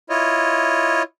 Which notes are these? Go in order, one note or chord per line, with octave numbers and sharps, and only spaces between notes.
E4 F4 C#5 D#5